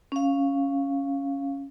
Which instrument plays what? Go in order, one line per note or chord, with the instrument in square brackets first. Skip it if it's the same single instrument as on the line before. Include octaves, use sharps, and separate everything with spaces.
[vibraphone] C#4 F5